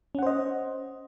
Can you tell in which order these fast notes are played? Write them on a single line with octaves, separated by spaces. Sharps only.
C#4 F#5 C5 D#5